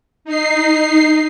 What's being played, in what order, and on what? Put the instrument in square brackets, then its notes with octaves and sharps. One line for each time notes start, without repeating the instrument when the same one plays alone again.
[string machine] D#4 C7